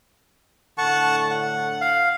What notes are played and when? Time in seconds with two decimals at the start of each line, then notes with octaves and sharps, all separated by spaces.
0.78 A2 D3 A4 F#5 A5 C#6
1.31 F#5
1.81 F5